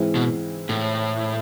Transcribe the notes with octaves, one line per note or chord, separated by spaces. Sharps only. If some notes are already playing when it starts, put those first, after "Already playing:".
Already playing: G#2 E3 G#3 C4 E4
B2
A2